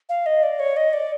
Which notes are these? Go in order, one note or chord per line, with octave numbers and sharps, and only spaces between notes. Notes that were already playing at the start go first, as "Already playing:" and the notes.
F5
D#5
D5
C#5
D#5
D5